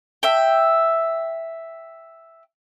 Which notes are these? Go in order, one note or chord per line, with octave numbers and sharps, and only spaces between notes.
E5 G5